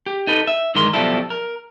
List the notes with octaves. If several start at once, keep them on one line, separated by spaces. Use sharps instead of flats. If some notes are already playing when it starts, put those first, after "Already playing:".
G4
D#4 A4 B4
E5
G2 D#3 E3 G#3 A#4 C6
B1 B2 F3 G3 E4 A4
A#4